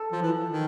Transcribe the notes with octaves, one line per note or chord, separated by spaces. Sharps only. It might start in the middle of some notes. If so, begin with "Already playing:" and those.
Already playing: A4
F3
E3
D#3